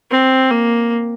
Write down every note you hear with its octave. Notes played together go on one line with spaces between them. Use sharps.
C4
A#3